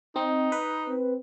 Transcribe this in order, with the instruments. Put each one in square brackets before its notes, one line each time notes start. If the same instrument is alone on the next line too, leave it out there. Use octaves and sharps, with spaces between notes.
[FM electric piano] C4 [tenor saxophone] D#4 [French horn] D#5
[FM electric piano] B4
[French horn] C4